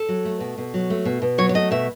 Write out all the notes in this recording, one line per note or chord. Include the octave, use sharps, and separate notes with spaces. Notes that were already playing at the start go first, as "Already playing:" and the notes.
Already playing: A4
F#3
A3
B2
B2
F#3
A3
B2
B2
F#3 C#5
C#5
A3 D#5
B2 E5